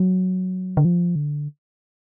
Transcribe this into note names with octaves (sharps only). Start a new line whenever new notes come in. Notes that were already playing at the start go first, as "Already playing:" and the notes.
Already playing: F#3
D3
F3
D3